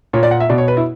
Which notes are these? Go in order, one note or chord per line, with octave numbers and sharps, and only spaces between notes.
A#2 C#5
D5
F#5
E5
B2 D5
C#5
B4
E4